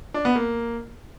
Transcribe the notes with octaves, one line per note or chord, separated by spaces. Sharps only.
D4
B3
A#3